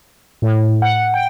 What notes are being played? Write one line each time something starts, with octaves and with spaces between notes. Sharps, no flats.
A2
F#5
G5